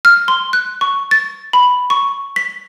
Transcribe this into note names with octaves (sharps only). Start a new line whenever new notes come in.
F6
C6
F#6
C#6
A6
B5
C#6
B6